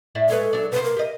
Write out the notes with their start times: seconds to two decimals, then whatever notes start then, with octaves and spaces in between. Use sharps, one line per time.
0.15 A2 D5 E5
0.30 G#3 C#4 A4 B4
0.53 F#3 D4
0.72 C3 B4 C5
0.84 A#4
0.96 G4 D#5